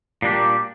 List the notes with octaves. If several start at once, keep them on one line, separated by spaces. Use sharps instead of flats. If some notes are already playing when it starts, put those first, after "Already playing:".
A#2 G3 A#3 D4 G4